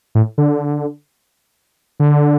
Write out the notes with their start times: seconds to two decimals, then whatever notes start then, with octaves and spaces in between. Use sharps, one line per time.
0.15 A2
0.38 D3
2.00 D3